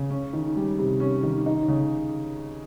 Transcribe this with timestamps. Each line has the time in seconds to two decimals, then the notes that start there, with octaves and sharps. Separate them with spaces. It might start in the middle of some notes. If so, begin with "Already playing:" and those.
Already playing: C#3
0.10 C#4
0.33 D#3
0.56 G3
0.79 C3
1.00 C#4
1.23 D#3
1.46 D#4
1.68 C#3